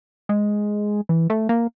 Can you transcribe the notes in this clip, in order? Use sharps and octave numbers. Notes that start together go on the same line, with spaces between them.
G#3
E3
A3
A#3